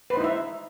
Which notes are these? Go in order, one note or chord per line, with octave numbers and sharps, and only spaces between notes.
D#4 E4 B4 C5 E5